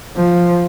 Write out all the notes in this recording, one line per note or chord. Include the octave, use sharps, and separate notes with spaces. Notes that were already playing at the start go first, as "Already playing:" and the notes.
F3